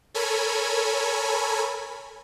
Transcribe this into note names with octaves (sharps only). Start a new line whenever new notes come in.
A4 A#4 C#5 G#5 B5